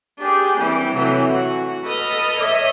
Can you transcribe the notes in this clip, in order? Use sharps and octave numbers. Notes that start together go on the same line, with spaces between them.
D4 G4 G#4
E3 G3 C4
C3 E3 F#3 A3
F#4
A4 B4 D#5 D#6 F6
C#5 D#5 E5